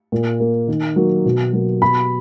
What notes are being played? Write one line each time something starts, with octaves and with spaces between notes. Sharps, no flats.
A#2
A#3
D#3
F#3 A#3
B2
F#3 A#3
B2 B5